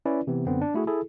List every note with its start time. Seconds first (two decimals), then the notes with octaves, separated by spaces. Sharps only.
0.05 C#4 E4 B4 D5
0.27 C3 E3 B3
0.46 F#2 D3 B3 C4
0.61 D4
0.74 A3 E4 F#4 G#4
0.87 E4 G#4 A4